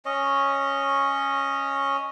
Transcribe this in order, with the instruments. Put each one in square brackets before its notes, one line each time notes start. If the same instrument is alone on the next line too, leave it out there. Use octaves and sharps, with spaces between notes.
[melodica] C#4 C#5 D#5